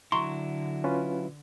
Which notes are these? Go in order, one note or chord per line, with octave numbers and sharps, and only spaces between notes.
D3 F#3 E4 A#5 C6 C#6
C#4 F4 B4